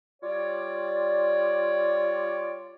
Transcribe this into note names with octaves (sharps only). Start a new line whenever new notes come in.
G3 F4 C#5 D5